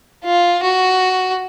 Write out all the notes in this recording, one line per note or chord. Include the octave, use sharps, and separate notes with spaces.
F4
F#4